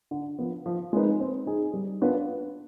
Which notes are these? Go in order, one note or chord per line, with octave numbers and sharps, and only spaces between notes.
D3
F3 B3
F3
G#3 C4 D#4 B4
C4
D#4 G#4
G3
B3 D4 F4 B4